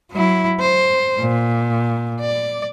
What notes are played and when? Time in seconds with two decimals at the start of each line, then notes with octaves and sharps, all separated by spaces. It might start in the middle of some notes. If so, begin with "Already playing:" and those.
0.12 F#3 E4
0.60 C5
1.20 A#2
2.20 D5